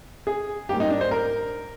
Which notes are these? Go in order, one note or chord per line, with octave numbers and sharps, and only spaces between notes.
G#4
G#2 G3 A#3 G4
D#4
D4
C5
A#4